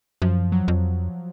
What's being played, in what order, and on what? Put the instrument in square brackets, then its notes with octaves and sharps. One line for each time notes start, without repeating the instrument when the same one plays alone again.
[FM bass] F#2 [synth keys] F3
[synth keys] F#3
[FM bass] F2